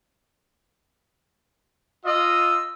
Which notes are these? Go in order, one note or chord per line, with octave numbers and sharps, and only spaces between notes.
F4 D#5 E6